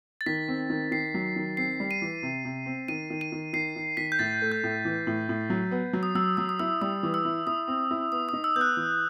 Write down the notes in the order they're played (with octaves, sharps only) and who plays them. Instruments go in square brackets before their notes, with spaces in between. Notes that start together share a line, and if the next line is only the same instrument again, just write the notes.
[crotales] A6
[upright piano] D#3 [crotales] B6
[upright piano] C4
D#3
[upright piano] D#3 [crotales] C7
[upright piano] F#3
D#3
[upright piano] C4 [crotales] C7
[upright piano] G3
[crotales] D#7
[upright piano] E3
C3
C3
C4
[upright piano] D#3 [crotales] D#7
[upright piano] D#3
[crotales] D#7
[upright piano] D#3
[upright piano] D#3 [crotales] C7
[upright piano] D#3
[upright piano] D#3 [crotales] B6
[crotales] G6
[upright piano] A2 [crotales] A6
[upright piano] A3
[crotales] G6
[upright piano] A2
E3
A2
A2
F#3
B3
F#3
[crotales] D#6
[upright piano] F#3 [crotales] E6
[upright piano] F#3 [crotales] D#6
[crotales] D#6
[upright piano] E4 [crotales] E6
[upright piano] G3 [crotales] D#6
[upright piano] E3
[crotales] E6
[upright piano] E4
[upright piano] E4 [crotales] D#6
[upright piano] C4
E4
[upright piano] B3 [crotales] D#6
[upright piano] D#4 [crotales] D#6
[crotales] E6
[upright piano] B3 [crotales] G6
[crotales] F#6
[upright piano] E3